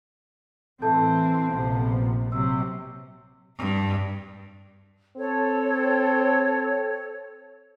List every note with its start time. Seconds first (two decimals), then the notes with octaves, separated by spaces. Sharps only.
0.82 A2 E3 C4 A4 A5 G6
1.53 A#1 C3 F3 A#3 B3
2.32 C3 F#3 E6
3.58 G2
5.17 C4 A4 C#5